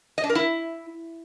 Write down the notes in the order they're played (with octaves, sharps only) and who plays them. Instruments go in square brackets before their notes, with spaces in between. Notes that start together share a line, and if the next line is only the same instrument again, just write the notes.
[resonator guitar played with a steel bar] D#5
D4
A#4
E4